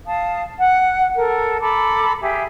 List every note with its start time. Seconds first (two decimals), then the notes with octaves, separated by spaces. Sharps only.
0.06 F5 A5 D#6
0.58 F#5
1.17 A4 A#4
1.61 A4 A#5 B5 D6
2.22 G4 G#4 E5